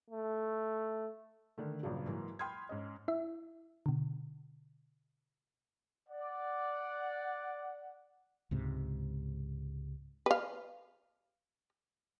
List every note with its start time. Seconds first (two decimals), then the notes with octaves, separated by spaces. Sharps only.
0.10 A3
1.58 D3 D#3 A3
1.83 A#1 G2 C#3 F#3
2.06 G#2 E3 F#3 A#3
2.39 G5 B5 C6 D#6 F6 G#6
2.69 G#2 C#4 D#5
3.08 E4 E5
3.86 B2 D3
6.09 D5 F#5
8.51 C#2 G#2 C3
10.26 B4 F5